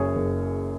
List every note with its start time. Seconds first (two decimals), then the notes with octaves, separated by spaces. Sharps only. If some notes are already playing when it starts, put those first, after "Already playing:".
Already playing: F#1 F#2 G#4 C#5
0.16 F#1